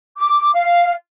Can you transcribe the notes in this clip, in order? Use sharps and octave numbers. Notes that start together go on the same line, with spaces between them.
D6
F5